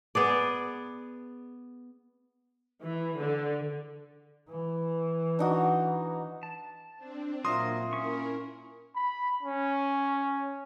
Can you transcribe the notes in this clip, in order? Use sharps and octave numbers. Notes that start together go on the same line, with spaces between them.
B3 G#4 D5
E3
D3
E3
D4 D#4 F#4
A5
C4 D4
A#2 F#3 F4 A#4 E5 F5 C6 D#6
C#4 E4 A#4 C#6
B5
C#4